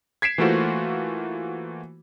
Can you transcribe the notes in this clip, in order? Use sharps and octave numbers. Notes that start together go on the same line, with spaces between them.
G#6 B6 C7 D7 E7
E3 A3 A#3 F4 F#4 C5